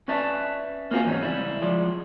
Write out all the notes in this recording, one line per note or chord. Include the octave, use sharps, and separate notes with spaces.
C#4 B4 D5 E5 A5
A#3 C4 F4 F#4 G#4
E2 G#2 C4 C#4 D#4
C#2 G3 E4
F3 G3 G#3 D5